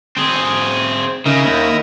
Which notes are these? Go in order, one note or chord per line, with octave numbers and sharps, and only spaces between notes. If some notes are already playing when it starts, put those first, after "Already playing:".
C4 G#4
C#3 D#4 E4 A#4
D#2